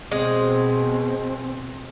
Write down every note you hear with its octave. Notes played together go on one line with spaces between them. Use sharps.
B2 G#3 C4